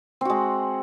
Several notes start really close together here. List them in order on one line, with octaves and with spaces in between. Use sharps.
C4 F#4 G#3